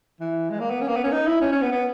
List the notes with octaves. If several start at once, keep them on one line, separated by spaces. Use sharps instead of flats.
E3
G#3
A#3
B3
C#4
A#3
B3
C#4
D#4
E4
C#4
C#4
B3
B3